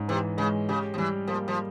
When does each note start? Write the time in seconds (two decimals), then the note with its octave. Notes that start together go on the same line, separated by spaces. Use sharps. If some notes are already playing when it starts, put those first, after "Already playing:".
Already playing: G#2 C#4
0.08 C3 E3
0.38 C#3 G#3
0.69 C#3 G4
0.94 F3
0.98 E3 G3
1.28 F3 A#3
1.48 F3